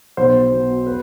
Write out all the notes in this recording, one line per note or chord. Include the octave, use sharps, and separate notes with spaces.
B1 C5
B2
B4